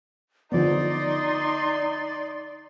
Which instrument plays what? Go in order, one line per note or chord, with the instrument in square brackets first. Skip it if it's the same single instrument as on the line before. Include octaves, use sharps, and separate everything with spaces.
[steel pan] D3 F3 B3 [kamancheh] D#4 C6 [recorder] D5